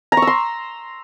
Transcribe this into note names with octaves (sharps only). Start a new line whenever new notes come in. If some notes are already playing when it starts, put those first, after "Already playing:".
A#5
C#6
E6
C6